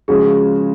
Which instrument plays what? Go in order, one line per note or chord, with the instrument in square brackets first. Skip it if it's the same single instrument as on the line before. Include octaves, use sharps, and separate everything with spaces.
[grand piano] C#3 F3 G#3 C#4 F#4 [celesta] G#4